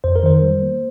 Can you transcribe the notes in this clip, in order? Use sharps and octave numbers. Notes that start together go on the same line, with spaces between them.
F2 C5
A#4
D#3 C5
G3
A#3